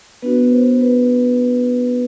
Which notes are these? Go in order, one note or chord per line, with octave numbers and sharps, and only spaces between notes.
B3 D4 F#4 B4
B4
C5
B4